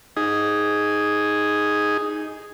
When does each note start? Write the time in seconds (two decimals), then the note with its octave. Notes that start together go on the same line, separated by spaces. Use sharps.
0.17 D#4 G#4